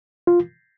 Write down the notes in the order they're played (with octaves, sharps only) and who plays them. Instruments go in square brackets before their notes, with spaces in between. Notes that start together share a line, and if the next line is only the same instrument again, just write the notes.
[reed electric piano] F4